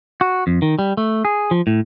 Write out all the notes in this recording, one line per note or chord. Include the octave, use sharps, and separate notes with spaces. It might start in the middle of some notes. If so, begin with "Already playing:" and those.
F#4
F2
D#3
G3
A3
G#4
F3
A2